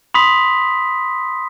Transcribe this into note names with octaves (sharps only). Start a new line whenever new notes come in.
B5 C6 D#6 B6